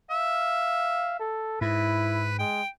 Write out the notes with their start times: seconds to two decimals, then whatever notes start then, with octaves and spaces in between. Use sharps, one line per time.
0.10 E5 F5
1.20 A4
1.61 G#2 E4 B4
2.39 G#3 G5